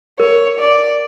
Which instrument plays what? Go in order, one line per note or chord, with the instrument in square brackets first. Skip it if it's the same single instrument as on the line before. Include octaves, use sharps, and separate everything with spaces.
[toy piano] A#4 [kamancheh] C#5
[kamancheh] D5